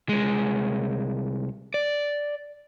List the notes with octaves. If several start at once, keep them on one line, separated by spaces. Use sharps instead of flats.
C2 G#3
D5